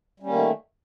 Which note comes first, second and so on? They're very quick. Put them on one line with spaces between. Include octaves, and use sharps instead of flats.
G3 C#4 A#3 D#3 A3